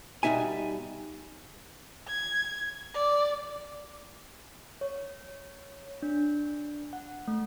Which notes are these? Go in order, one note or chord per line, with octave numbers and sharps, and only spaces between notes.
B2 G3 D#4 E5 G#5
G#6
D5
C#5
D4
F#5
A3